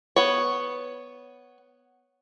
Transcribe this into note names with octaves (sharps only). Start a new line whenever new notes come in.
B3 C#5